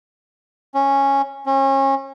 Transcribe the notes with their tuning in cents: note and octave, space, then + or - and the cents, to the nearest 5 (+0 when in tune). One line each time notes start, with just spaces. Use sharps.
C#4 -10
C#4 -35